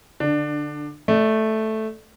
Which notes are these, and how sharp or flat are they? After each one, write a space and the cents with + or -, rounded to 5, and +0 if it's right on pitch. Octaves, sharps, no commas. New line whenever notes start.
D3 +0 D4 +20
A3 -5 D5 +25